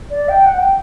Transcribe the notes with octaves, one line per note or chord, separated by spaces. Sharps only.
D5
G5
F#5
G5